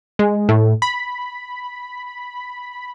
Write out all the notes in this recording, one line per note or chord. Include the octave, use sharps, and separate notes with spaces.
G#3
A2
B5